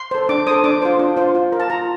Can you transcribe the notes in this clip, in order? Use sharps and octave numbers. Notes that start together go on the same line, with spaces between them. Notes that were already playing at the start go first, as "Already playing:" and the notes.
Already playing: C6
A4 C5
D4 D6
A4 C5 D#6
D4 D6
F4 C5
D4
F4 C5
F4
A#4
A5
F4 A#5